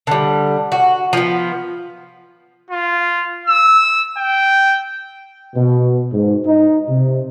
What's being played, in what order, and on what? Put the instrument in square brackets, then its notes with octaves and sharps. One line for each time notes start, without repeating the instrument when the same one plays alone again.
[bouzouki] D3 G3
F#4
F3 B3
[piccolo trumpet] F4
E6
G5
[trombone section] B2
G#2
D#4
C3